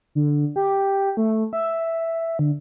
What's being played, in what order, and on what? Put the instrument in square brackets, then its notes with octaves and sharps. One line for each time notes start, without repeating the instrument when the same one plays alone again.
[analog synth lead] D3
G4
A3
E5
D3